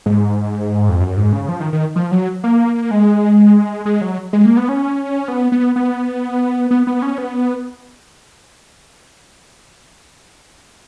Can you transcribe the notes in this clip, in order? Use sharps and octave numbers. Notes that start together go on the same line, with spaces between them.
G#2
F2
F#2
G#2
C#3
F3
D#3
D#3
F3
F#3
A#3
G#3
G#3
F#3
G#3
A#3
B3
C#4
B3
B3
B3
B3
B3
C#4
B3